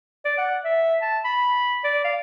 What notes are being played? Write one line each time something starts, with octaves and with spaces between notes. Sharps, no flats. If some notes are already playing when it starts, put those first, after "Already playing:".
D5
F#5
E5
A5
B5
D5
F5